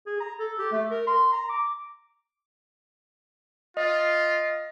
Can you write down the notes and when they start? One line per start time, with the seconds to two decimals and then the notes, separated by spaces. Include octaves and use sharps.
0.07 G#4
0.20 A#5
0.39 A4
0.58 G4
0.72 A3
0.91 A#4
1.07 C6
1.32 A#5
1.49 D6
3.77 F4 D#5